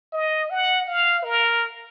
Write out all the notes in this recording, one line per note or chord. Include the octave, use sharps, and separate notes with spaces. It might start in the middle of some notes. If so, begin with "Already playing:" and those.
D#5
F#5
F5
A#4